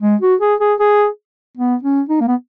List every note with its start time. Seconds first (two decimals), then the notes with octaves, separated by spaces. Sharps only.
0.02 G#3
0.22 F#4
0.41 G#4
0.60 G#4
0.80 G#4
1.58 B3
1.83 C#4
2.09 D#4
2.21 A#3
2.28 B3